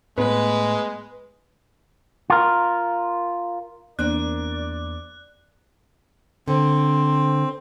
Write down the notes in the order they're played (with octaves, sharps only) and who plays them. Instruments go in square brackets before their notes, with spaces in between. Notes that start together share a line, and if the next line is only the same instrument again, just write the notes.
[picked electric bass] A2 [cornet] G#3 [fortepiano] B3 [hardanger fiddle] B4
[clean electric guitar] F4 A#4
[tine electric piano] E2 [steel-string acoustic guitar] A#3 C4 D4 [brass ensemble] D5 [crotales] F#6
[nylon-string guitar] D3 [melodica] C4